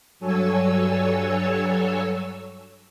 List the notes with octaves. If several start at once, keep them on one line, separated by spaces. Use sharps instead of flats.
G2 F#3 A4 C#5 G#5 E6